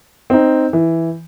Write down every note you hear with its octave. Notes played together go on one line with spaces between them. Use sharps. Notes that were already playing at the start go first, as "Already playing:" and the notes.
C4 D#4
E3